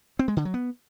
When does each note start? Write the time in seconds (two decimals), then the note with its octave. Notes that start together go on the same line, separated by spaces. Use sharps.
0.19 C4
0.28 G#3
0.37 D3
0.45 F#3
0.54 B3